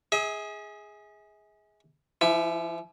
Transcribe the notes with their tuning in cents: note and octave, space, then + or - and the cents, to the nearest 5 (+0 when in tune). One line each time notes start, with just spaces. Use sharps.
G#4 +0 E5 -45
F3 -40 E4 +0